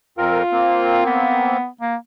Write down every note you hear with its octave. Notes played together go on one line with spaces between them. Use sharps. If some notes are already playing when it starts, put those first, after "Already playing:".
F2 C4 F4 A#4
A#3 C4
B3
A#3